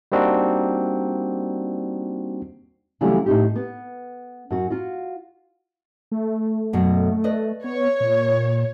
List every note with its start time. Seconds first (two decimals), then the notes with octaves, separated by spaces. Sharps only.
0.12 G3 A#3 C4 D4 D#4 F#4
3.01 C#3 E3 F#3 G3 A3 D4
3.26 A2 D#4 G4
3.56 B3
4.50 F#2 F#4
4.70 F4 F#4
6.12 A3
6.73 F#2 B2
7.24 B4 D5 D#5
7.64 B3 C#5
8.01 A#2